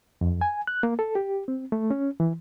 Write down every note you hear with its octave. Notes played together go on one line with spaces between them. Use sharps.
F2
G#5
F#6
A#3
A4
G4
C4
A3
C#4
E3